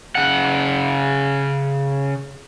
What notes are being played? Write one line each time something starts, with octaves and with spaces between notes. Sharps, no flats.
C#3 F#5